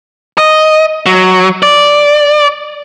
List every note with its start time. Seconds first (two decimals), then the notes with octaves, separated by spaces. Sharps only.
0.38 D#5
1.06 F#3
1.63 D5